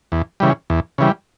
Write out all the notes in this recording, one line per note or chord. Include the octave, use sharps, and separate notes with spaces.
E2
C#3 E3 G3
E2
C#3 E3 G3